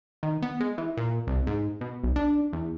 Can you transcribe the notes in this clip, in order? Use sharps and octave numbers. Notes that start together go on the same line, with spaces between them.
D#3
B3
G#3
E3
A#2
C2
G#2
B2
B1
D4
E2